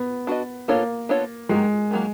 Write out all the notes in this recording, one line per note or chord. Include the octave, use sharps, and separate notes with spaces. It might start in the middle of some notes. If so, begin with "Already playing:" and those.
Already playing: B3
D4 F#4 B4 D#5
A#3 B3 D4 F4 A4 C#5
B3 D4 F4 A4 C#5
D#3 F#3 G#3 A#3
D#3 F#3 A#3